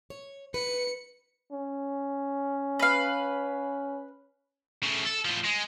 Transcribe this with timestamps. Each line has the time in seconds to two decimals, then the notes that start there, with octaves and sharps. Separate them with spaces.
0.10 C#5
0.54 B4 C#7
1.51 C#4
2.79 B4 F5
4.83 C#3 A3
5.05 A4
5.25 A2 F3
5.44 G#3